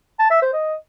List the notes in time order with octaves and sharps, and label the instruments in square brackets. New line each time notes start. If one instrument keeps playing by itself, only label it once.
[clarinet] A5
E5
C5
D#5